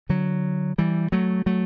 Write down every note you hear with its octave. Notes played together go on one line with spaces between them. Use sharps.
D3 F#3
E3 G3
F#3 A3
F#3 A3